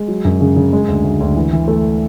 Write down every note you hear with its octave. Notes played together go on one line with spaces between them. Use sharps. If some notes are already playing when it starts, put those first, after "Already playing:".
Already playing: G#3
F#3
F#2
C#3
C#3
G#3
D2
D2
D2
E3
E3
A3